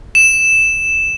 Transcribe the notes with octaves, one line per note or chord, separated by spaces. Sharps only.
E7